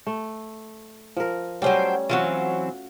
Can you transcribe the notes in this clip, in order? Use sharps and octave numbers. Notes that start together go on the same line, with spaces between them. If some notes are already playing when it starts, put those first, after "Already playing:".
A3
F3 A#4
F#3 G3 A3 C#4 C5 G5
E3 F#3 C4 F4 F#4